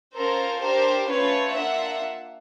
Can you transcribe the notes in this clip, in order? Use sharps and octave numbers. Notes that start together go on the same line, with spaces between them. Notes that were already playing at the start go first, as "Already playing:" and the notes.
C#4 F4 A4 A#4 C5
D4 G4 A#4 C5
A3 C#4 F4 B4 C#5
A#3 D4 F4 E5 F#5